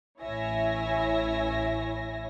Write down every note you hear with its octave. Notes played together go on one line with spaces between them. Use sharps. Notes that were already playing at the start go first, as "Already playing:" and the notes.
A1 E4 C#5 E5 G#5 A#6